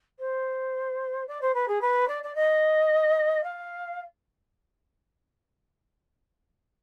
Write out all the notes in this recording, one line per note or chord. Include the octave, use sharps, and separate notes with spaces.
C5
D5
C5
B4
G#4
B4
D5
D5
D#5
F5